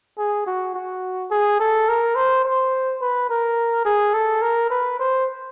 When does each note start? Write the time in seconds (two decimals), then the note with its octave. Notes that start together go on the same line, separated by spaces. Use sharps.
0.18 G#4
0.47 F#4
0.75 F#4
1.31 G#4
1.60 A4
1.89 A#4
2.16 C5
2.45 C5
3.01 B4
3.30 A#4
3.85 G#4
4.14 A4
4.42 A#4
4.70 B4
4.99 C5